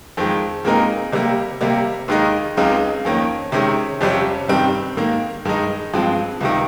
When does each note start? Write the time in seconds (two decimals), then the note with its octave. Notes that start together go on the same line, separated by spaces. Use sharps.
0.17 F2 D#3 G#3
0.65 A#2 G#3 C4 D#4 A#4
1.12 C3 G3 A#3
1.61 C3 G3 A#3
2.08 D#2 D#3 G#3 D#4
2.57 C#2 C#3 G#3 C4 D#4
3.05 F2 D#3 A#3 C#4
3.52 C3 D#3 G#3 C#4
4.01 F2 C3 G3 C#4
4.48 G2 D#3 G3 C4
4.97 G#2 D#3 A#3
5.45 G2 D#3 G#3 D#4
5.93 G2 F3 G#3 C4
6.41 C#2 C3 D#3